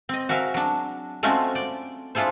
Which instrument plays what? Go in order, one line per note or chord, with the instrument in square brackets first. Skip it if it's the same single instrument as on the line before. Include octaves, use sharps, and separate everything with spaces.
[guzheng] C4 D#5
F#4 G#4 A#4 E5 F5
F#3 D4
G#3 A3 C4 C#4 F4 F#4
D5 G5
D4 E4 F4 G#4 A4 C5